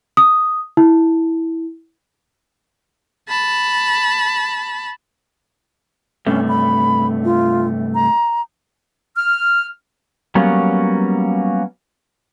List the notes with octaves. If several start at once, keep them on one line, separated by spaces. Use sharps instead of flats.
D#6
E4
A5 B5
G2 C3 A3 C#4
B5
F4
A#5
F6
F#3 G3 A#3 B3 C#4